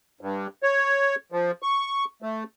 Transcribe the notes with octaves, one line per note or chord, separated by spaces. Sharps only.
G2
C#5
F3
C#6
A3